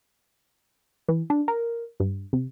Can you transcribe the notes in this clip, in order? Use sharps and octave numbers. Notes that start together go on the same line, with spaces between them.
E3
D4
A#4
G2
C3